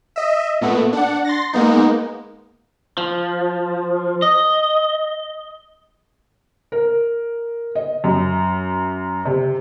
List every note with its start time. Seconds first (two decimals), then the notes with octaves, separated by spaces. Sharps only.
0.16 D#5 E5
0.61 A#2 A3 B3
0.93 D4 F#5
1.25 C6 A6 A#6
1.53 G#3 A#3 B3 D#4
2.98 F3
4.22 D#5
6.72 A#4
7.75 D#5
8.04 F#2
9.25 C3